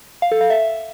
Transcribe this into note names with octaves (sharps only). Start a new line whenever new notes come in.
F5
A4
F5
E5